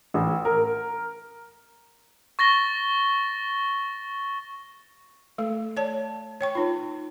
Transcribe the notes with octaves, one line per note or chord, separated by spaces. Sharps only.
A1
A#4
C#6 A6 A#6 G7
A3 A4
C#5 D5 A5
C#5 G5 C#6
D#4 F4